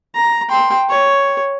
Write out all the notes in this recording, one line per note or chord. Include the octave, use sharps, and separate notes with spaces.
A#5
G5 C6
C#5